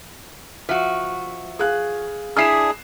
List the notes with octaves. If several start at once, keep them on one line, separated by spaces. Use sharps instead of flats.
F3 F#4 E5
G#4 F5 F#6
D4 E4 G#4 D#6 C7 E7